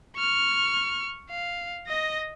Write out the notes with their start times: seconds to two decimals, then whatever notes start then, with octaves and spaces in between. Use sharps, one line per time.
0.16 C#6 F6
1.30 F5
1.87 D#5 A#6